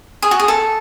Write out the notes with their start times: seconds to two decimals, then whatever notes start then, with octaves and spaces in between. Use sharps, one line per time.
0.22 G#4
0.31 F#4
0.40 G#4
0.48 A4